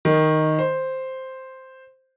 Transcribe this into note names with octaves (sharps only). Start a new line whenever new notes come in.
D#3
C5